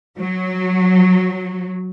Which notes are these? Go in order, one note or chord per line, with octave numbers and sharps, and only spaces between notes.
F#3